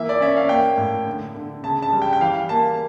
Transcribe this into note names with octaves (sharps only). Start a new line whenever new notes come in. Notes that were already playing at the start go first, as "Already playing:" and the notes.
Already playing: E3 A#3 E5
D5
C#4 E5
F5
A#3 G5
A2
D3
D3
C#3 A5
A5
G3
G5
G5
E3 F5
A#3 A5